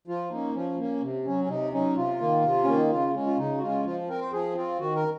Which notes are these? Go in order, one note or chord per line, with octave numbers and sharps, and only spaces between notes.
F3 F4
A#3 C#4 D#4
F3 C#4
A#3 C#4
C3
F#3 C#4
C#4
C3 D#4
F#3 C#4 D#4
C3 F4
D#3 A#3
C3
D#3 A#3 C#4
D#4
C#3 F4
G#3 C#4
F4
C#3 D#4
F#4
G#3 C#4 F4
F3 F4
C4 A#4
C5
F3 G#4
C4 F4
D#3 F#4
A#4